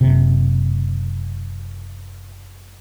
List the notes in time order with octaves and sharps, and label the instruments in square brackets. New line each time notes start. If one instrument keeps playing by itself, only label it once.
[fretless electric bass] F#1 C3